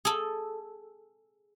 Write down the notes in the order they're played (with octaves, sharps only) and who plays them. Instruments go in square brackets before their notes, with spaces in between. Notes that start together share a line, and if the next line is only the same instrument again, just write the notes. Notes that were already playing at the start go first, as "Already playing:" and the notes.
[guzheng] G#4 A4